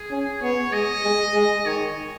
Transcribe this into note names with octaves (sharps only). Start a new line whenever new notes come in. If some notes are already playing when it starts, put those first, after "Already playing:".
Already playing: G#4
C#4
B3 C#5
G#3 D#5
G#3
G#3
D#3 C#5